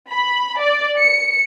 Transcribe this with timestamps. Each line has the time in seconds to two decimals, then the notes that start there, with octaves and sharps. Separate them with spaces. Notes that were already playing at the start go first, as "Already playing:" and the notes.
0.11 B5
0.59 D5
0.98 C#7